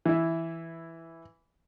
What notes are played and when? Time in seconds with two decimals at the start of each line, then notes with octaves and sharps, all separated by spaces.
0.05 E3 E4